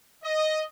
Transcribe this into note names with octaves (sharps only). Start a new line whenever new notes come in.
D#5